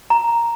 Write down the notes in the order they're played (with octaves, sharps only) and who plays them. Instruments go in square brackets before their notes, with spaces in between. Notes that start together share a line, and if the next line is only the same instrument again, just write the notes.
[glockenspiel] A#5